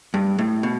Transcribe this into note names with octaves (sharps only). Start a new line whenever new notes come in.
G2
A2
B2